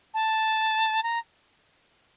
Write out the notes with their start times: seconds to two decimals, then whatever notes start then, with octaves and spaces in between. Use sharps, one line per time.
0.14 A5
1.03 A#5